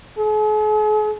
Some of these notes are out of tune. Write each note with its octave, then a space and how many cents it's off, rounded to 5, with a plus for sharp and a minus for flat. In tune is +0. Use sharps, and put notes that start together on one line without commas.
G#4 +45